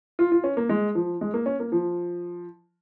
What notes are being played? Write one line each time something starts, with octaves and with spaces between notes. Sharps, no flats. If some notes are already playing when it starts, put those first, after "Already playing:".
F4
F4
C#4
A#3
G#3
F3
G#3
A#3
C#4
A#3
F3